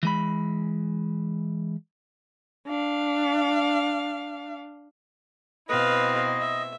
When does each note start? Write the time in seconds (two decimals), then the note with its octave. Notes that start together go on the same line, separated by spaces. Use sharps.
0.03 E3 G#3 B5
2.67 D4 F5
5.69 B2 C4 E4 B4 D#5 F5
6.40 E5